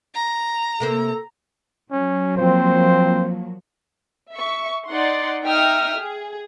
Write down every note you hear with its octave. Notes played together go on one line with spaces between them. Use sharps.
A#5
C3 A#3 A4 C5
F#3 C#4
F3 A#3 C4 C5
E5 C#6
D#4 D5 F#5 C6
D#4 E5 G5 D#6 F6
G#4